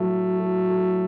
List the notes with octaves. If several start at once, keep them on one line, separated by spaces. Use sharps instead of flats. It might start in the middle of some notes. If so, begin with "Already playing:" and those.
Already playing: A2 F#3 A3
F#4 A4
F#4 A4